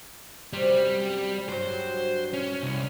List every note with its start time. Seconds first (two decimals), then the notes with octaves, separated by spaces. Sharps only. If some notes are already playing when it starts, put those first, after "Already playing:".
0.53 F#2 C3 G3
1.49 G2 F#3 C5
2.33 C#4
2.63 C2